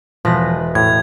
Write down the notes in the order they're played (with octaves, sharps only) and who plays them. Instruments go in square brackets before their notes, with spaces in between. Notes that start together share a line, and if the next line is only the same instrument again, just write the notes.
[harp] E1 B4 A#6 [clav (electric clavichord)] F3
[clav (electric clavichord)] A2 [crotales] G#6